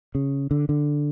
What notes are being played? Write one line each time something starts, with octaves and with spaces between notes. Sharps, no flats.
C#3
D3
D3